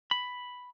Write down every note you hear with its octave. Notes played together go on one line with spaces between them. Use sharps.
B5